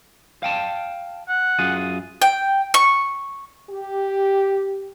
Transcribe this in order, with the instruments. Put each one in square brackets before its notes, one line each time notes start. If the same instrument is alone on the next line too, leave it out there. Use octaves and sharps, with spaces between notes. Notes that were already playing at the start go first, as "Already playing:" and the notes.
[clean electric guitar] F5 G5 A5
[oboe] F#5
[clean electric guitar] F#2 F4 G#4
[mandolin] G5
C#6
[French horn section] G4